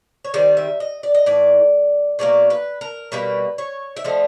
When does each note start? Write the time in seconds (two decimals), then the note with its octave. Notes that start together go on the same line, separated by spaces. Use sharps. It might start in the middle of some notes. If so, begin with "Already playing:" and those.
0.25 C#5
0.34 D#3 G3 C4 D5
0.57 E5
0.80 D#5
1.03 D5
1.14 D#5
1.26 A2 E3 D5
2.19 B2 F#3 A#3 D5
2.50 B4
2.81 A#4
3.12 B2 G3 A#3 B4
3.58 C#5
3.97 E5
4.04 D3 F3 A3 D#5